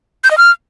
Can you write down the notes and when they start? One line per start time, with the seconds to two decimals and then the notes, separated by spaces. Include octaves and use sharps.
0.24 G6
0.31 D#5
0.37 F6